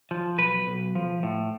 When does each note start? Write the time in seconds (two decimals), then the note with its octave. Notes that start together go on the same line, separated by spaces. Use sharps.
0.11 F3
0.38 B1 B4
0.67 B1
0.95 F3
1.23 A2